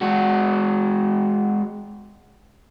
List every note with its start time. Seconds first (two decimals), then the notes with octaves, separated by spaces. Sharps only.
0.02 G#3 F#4